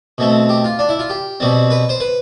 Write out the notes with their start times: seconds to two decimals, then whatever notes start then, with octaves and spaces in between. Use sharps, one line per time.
0.18 B2 A3 C4
0.49 G4
0.64 F4
0.79 D4
0.89 E4
0.99 F4
1.10 G4
1.40 B2 G3 C4
1.70 B4
1.89 C5
2.00 B4